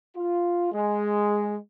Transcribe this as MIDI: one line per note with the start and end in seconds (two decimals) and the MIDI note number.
0.16 0.71 65
0.72 1.56 56